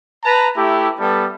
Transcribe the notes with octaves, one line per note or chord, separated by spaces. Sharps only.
B4 A5 A#5
A3 E4 G4
G3 B3 A4